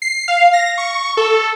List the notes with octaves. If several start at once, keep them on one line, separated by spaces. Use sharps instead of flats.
C7
F5
A#6
C#6
A4